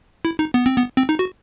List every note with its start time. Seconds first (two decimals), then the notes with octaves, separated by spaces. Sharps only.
0.25 E4
0.39 D#4
0.54 B3
0.66 C4
0.77 B3
0.97 C4
1.09 D#4
1.19 F#4